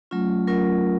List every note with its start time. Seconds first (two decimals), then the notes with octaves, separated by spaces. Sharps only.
0.11 F#3 A3 C#4 F4
0.47 F#3 A3 C#4 F4 A#4